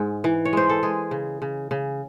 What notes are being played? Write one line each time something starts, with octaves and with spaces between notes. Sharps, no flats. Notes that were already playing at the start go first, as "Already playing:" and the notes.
Already playing: G#2 G#3
E3
C#5
G#3 C5
A4
G#3 G#4
C#3
C#3
C#3